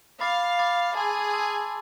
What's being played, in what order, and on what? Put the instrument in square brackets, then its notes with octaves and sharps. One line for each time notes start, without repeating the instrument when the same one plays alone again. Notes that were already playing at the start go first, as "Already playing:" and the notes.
[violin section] F5 [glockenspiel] B5 D6 A6
[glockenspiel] B5 D6 A6
[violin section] G#4 [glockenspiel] A5 C6 E6
[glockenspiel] A5 C6 E6